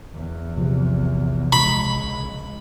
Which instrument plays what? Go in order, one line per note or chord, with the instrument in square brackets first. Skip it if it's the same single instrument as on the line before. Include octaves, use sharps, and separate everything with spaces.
[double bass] E2
[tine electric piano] A#1 C3 F3
[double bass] C#2 G#3 [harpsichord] B5